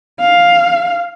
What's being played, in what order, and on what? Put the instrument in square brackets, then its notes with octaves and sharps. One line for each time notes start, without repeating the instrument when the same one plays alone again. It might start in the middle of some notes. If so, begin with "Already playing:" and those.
[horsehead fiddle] F5